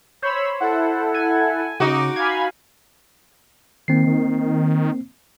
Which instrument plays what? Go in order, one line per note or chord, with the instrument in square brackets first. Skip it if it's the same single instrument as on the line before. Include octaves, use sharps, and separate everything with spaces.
[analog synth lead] C5 [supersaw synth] C#5 B5 E6
[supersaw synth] E4 A4 [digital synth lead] F#5
[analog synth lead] G#5
[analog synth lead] C#3 [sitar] D#4 F#4 [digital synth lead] D6
[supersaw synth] F5 G#5 B5 [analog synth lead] G#6
[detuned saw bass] D#3 [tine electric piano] A#3 C4 C7
[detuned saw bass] D#3